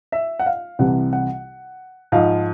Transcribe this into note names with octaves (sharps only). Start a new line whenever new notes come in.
E5
F#5
F5
C2 C3 E3 G3 F#5
F#5
G#2 F3 F5